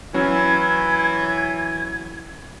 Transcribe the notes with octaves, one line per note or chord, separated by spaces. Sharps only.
E3 F#3 C#4 G#6